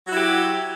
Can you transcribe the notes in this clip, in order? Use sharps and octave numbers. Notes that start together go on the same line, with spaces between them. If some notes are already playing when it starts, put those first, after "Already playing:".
F#3 E4 F#4 G4